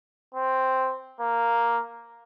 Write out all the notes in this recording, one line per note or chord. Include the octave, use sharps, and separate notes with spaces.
C4
A#3